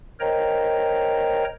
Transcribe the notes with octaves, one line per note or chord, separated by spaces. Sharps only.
A#4 C5 C#5 D#5 G5 A#5